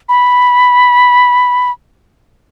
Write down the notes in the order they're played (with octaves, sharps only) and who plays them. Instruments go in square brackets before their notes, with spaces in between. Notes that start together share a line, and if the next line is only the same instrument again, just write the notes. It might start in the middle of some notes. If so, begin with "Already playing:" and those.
[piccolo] B5